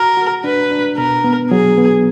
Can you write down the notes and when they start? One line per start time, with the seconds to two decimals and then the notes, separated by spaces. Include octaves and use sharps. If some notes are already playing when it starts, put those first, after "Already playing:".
Already playing: F#4 A#4
0.17 F#4
0.44 D4 B4
0.71 D4
0.97 B2 A#4
1.24 B3
1.51 F#3 G#4
1.78 B3